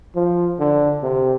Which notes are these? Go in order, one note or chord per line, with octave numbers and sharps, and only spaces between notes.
F3
D3
C3